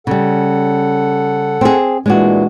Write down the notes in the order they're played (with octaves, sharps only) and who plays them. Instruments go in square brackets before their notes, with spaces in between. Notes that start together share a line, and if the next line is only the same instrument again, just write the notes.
[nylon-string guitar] C#3 G3 [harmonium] A4 F#5
[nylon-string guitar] C4 G#4
[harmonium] A#2 E3 [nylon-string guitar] G#3 D4 F#4